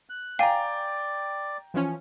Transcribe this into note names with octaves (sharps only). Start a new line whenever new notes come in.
F#6
D5 F5 G5 G#5 A#5
E3 F3 C#4